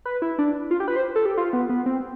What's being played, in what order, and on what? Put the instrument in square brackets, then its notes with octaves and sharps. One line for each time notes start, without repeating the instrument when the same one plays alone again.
[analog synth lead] B4
E4
D4
F4
G4
B4
C5
A4
G4
F4
B3
B3
C4